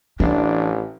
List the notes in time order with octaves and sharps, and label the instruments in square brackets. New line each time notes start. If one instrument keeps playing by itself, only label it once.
[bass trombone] A1 [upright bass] E3 [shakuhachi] D4